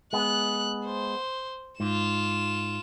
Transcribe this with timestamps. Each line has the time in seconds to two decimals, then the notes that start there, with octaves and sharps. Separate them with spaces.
0.13 G#3 B3 F#6
0.86 C5
1.80 G#2 F4 E7